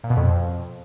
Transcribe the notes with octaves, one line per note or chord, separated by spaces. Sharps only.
A#2
B2
F2